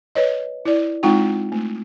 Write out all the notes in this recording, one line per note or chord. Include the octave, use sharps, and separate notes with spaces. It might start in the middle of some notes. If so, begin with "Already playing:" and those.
B4 C#5 D#5
E4 D5
G#3 C4 D#4 F4 G5
A3